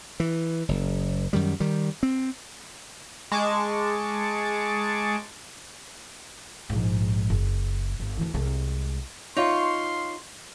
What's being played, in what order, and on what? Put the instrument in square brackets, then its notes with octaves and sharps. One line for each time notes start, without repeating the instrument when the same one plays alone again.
[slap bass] E3
F#1
F#2 D#3 G3
D#3 G3
C4
[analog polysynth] G#3 A5 C#6 D6
[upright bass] A#1 G#2
F#1
G1
D2 E3
C2 G#3
[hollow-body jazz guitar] D#4 F4 [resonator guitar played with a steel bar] C#5 [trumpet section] F5 C6